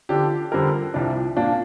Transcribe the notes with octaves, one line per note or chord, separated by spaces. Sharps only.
D3 F3 D4 G4
F2 D3 G3 C4 A#4
C2 C3 F3 D4
A#2 A#3 D4